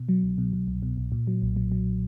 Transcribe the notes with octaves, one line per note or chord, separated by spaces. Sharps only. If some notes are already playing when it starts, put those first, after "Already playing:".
Already playing: B2
F#3
C2
B2
B2
C2
B2
C2
A#2
F#3
B1
F#3
F#3